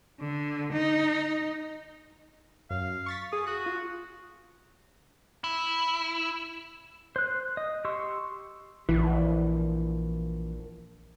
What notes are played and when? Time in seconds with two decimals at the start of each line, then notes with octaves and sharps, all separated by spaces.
0.20 D3
0.73 D#4
2.70 F#2 F5
3.06 C#6 A6 B6
3.33 G#4 C#6 D#6
3.47 F#4 D#6 F#6
3.66 F4
5.44 E4
7.16 C5 F#6
7.57 D#5
7.85 G4 C6 C#6 E6
8.89 A#1 E3